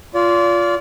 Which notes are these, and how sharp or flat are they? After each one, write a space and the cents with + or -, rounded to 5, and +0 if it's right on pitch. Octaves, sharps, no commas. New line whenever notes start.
F4 +0 D5 -35